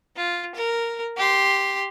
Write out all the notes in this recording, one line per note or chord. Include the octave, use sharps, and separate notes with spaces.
F4
A#4
G4 C6